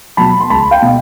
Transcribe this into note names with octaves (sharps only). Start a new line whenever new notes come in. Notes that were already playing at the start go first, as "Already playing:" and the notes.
B2 F#3 A5 B5
C6
C#2 A5 B5
F5 G5
B2